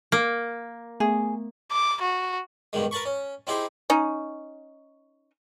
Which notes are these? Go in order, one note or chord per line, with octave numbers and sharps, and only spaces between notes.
A#3
A3 B3 G#4
D6
F#4
G2 B2 D#3 G#3
A#4 B4 A5 B5 C#6
C#4
C4 D#4 E4 G4 G#4 C5
C#4 D#4